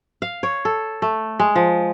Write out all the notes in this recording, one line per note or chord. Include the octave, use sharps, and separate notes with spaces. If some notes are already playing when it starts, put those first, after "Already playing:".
F5
C#5
A4
A3
G#3
F3